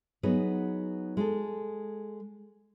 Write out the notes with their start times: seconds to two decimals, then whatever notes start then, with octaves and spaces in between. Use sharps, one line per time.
0.23 F#3 B3 D#4 G#4 B4
1.17 G#3 G#4 A4